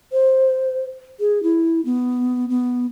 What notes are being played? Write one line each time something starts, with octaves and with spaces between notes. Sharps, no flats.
C5
G#4
E4
B3
B3